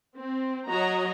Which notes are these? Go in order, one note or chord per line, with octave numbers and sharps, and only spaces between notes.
C4
F#3 F#4 C#5 D#5 A#5